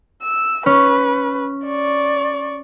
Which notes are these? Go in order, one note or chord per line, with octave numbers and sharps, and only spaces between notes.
E6
C#4 B4
D5 C#6